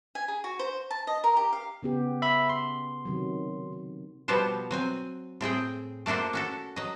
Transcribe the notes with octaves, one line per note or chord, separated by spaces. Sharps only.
G#5
G#4
F#4
C5
A5
D#5
A#4
G4
F5
C#3 B3 G4
E5 B5
C6
C3 D#3 F#3
B2 F3 G3 B3 F#4 C5
F#3 C4 G#5
A2 C4 G#4 G5
A3 A#3 D4 F#4 C5
C#4 F#4 A4
F#3 D#5